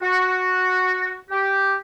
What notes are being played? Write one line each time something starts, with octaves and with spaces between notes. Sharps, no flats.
F#4
G4